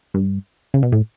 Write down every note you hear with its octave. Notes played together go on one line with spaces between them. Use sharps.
G2
C#3
B2
A2